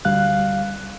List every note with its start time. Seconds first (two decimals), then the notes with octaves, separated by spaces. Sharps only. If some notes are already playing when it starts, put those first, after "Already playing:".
0.05 D2 G3 F5 F#6